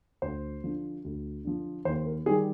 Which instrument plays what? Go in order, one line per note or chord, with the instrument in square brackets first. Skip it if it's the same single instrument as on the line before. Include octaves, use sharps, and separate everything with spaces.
[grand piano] D2 C5
D3 F3
D2
D3 F3
D#2 C5
A#4
D#3 G3 G#4